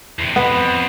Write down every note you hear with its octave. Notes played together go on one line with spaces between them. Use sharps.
E2 C3
B3
F2